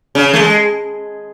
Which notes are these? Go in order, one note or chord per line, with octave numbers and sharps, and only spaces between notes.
C#3
A3
G#3